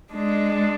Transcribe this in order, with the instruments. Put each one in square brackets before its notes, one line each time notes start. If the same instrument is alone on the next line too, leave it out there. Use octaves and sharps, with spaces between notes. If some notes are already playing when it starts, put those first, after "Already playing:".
[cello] G#3 [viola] D4